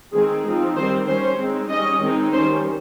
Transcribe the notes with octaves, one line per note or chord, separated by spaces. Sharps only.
D#3 G#3 C4 D#4 G#4
F3 C4 D#4
D#3 G3 C4 C5
G3 C#4 C5
G#3 C4 D#4
G3 C#4 D#5
D#3 G#3 C4 D#4
D#3 G3 C#4 C5